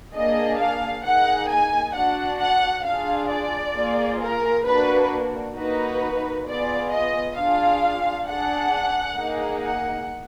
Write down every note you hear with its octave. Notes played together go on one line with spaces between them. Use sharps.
A#3 D4 G#4 D#5
F5
A#3 D#4 G#4 F#5
G#5
D4 F#4 F#5
F#5
D4 F4 G#4 F5
D5
A#3 F4 G#4
A#4
A#3 D4 F#4 B4
A#3 D#4 F#4 B4
B3 F4 G#4 D5
D#5
D4 F4 G#4 F5
D4 G#4 F#5
A#3 D#4 G#4
F#5